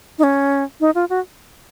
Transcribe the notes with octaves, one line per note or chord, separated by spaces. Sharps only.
D#4
C#4
D#4
F4
F#4